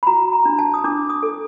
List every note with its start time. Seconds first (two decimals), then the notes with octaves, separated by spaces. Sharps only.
0.03 B5
0.07 F#4 A#5
0.33 A#5
0.45 D4
0.59 A5
0.74 D#6
0.84 D4 D6
1.10 D#6
1.23 A4